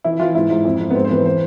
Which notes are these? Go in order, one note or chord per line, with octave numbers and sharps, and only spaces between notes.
E3 E4
E3 F4
G#2 E4
G#2
F2
F2
B3
G#2 C4
C5
E3 B4
E3 C5